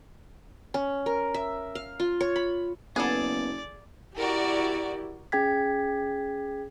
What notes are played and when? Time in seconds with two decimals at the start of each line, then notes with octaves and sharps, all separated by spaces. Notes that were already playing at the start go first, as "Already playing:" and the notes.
0.74 C#4
1.06 A#4
1.34 E5
1.75 F5
2.00 F4
2.21 C#5
2.36 B5
2.96 F#1 B3 G#4 A4 D5
4.17 E4 F#4 G4 A#4 D5
5.32 C#4 G#4 G5 G#6 B6